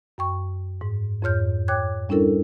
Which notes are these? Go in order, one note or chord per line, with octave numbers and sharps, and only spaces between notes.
F#2 G5 C#6
G#2
F2 G#2 C#5 F6 G6
C#5 G5 D6 F#6 G#6
G3 C#4 D4 E4 A4 A#4